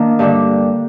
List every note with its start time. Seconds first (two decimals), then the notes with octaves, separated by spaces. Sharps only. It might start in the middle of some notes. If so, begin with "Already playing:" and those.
Already playing: D#3 A#3 D4
0.19 G2 D3 G3